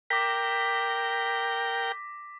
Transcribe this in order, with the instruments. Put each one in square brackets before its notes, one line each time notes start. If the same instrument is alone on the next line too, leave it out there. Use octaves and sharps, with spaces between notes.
[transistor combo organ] A#4 G5 [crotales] D6 A#6 B6